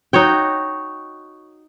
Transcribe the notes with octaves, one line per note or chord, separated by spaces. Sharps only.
D#4 F#4 C#5 G5